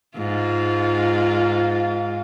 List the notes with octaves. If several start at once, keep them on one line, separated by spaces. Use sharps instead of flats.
G#2 F4